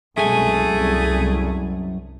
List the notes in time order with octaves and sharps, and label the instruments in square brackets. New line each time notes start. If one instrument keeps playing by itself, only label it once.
[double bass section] C2 B2 G#3 [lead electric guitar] F#2 G#5 [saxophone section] A3 G#4
[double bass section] C2